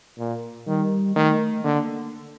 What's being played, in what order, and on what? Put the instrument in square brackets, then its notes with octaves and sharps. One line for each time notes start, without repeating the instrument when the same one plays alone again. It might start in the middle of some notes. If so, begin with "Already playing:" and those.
[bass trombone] A#2
[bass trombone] D#3 [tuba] G3
[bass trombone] D#3 [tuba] A3
[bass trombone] D3 [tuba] A#3